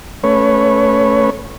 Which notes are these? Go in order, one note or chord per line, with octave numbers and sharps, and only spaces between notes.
A3 C#4 B4 C#5